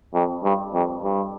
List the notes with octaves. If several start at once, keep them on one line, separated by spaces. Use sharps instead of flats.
F2
G2
F2
G2